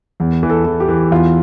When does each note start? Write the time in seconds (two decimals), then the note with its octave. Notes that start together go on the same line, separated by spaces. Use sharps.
0.20 E2
0.43 E3
0.50 A4
0.65 E3
0.80 G4
0.88 E3
1.11 E2 F4